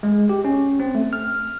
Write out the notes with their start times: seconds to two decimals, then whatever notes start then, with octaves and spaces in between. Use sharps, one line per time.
0.03 G#3
0.29 G4
0.45 C#4
0.80 C4
0.95 A3
1.13 F6